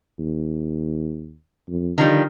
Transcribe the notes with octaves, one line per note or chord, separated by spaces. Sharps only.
D#2
F2
D3 D#3 F3 G3